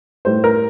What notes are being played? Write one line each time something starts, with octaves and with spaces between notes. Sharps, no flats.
A2 G3 C5
A#4